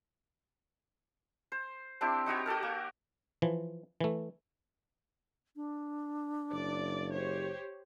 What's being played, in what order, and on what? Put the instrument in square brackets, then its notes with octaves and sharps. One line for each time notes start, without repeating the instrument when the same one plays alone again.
[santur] C5
C4 D4 E4 G4
D#4 F#4 G4 C#5
F#4 G4 A4 A#4
A#3
[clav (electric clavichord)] E3 F3
E3 A3
[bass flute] D4
[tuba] F#1 [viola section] D5
[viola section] G4 C5 C#5